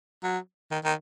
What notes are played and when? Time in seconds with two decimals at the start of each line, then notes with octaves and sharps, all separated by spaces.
0.24 F#3
0.71 D#3
0.84 D#3